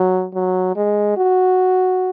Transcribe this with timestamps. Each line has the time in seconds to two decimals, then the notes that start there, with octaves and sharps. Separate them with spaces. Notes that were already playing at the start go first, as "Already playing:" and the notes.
Already playing: F#3
0.34 F#3
0.76 G#3
1.17 F#4